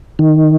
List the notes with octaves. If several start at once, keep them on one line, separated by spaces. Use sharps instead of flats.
D#3